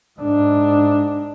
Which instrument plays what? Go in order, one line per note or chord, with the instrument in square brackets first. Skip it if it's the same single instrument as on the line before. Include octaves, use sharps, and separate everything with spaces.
[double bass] G#2 D4